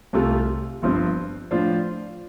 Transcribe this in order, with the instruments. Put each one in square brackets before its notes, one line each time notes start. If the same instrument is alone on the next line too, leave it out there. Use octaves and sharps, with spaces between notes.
[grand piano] C2 C3 A3 F4
G1 G2 F3 C4
A2 F3 D4 F4 C5